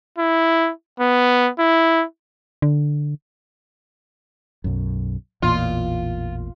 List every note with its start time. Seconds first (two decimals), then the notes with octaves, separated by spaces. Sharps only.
0.19 E4
1.00 B3
1.59 E4
2.62 D3
4.64 B1 F#2
5.42 A1 E2 A#2 F4